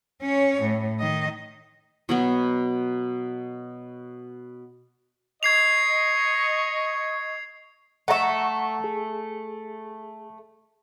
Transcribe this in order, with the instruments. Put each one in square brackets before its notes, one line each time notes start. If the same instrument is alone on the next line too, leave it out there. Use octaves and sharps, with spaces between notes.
[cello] C#4 C#5
A2
D#3 D#5
[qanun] B2 F#3 B3
[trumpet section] D#5 C#6 [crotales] G#6 C7 F7
[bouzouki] A3 E5 [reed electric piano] F#5 A#5 C#6
[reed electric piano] G#4